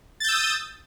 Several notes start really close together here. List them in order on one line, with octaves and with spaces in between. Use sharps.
A6 G6 E6 D#6